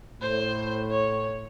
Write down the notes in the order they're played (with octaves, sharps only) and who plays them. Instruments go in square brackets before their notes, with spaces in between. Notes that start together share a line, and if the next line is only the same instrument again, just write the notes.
[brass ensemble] A2 [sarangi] C5
[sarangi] C#5